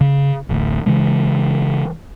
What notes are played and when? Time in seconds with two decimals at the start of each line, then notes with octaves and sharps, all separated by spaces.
0.01 C#3
0.49 D1 A1 D2
0.86 C#3 E3 G#3